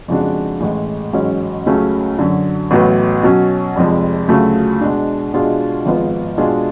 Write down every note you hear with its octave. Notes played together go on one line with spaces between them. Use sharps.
F2 C#3 G#3 D4 F#4
A1 A2 G#3
A1 G#2 F#3 C#4
C#2 C#3 F#3 A3 C#4
F#2 D3 F#3
A1 A2 F#3 B3
B2 F#3 C#4
F1 F2 F3 G#3
D2 C#3 F#3 A3 F4
B2 G#3 D4
B2 G#3 D4 F4 G#4
G#1 G#2 F3 B3 F4
B2 G#3 D4 F4 G#4